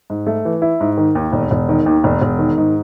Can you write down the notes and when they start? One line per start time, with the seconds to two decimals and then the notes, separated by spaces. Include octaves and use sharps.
0.10 G#2
0.27 A3
0.45 E3
0.62 E4
0.81 G#2
0.97 D#3
1.15 D#2
1.33 E1
1.51 E1
1.69 D#3
1.86 D#2
2.04 E1
2.22 E1
2.39 D#3
2.58 G#2